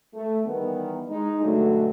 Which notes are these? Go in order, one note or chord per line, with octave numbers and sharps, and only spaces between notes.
A3
D#3 E3 G3 B3
G#3 D#4
G2 B2 D3 F#3 G#3 A3